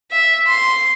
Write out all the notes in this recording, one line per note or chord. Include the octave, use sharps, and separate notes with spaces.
E5
C6